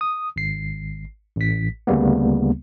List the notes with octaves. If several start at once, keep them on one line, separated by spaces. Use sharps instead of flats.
D#6
G#1 C7
A1 B6
D2 C#3 G3 A#3 B3